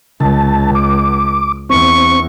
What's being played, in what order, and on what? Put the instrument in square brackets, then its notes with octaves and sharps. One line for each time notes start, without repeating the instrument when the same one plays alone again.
[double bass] C#2 [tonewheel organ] C#3 A5
[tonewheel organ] D6
[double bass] E2 [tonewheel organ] C4 [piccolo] C#6